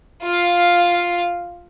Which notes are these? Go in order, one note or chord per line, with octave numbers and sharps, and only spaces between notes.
F4 F5